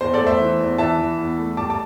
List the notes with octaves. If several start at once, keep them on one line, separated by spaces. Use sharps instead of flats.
E2 C5
A4 D5
A3
C5 E5
E3
E2
E3 E5 A5
E3
E2
A3
G3 A5 D6
A5 D6